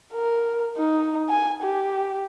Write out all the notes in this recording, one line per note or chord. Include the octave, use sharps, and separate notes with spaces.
A#4
D#4
G#5
G4